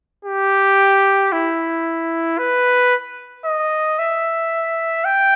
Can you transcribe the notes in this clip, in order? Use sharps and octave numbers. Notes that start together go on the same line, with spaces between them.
G4
E4
B4
D#5
E5
G5